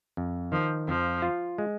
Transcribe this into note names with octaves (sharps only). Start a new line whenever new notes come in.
F2
D#3 F3
F2 F3
F4
G#3